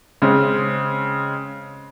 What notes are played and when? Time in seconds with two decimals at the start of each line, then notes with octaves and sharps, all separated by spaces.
0.22 C#3 G#3 C4 C#4